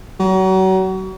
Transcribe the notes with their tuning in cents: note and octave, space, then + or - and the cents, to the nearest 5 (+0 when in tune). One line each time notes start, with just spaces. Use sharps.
F#3 +35